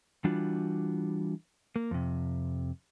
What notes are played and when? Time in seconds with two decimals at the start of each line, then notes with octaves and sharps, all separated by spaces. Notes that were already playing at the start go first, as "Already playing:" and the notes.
0.24 E3 G3 D4 F4 F#4
1.76 A#3
1.91 F2 C3